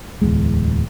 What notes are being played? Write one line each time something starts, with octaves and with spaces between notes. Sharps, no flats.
D1 E2 G#3